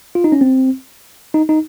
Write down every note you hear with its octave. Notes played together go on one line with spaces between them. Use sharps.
F4
D#4
C#4
C4
D#4
D#4